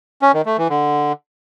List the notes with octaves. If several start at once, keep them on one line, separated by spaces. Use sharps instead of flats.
C#4
D#3
A3
E3
D3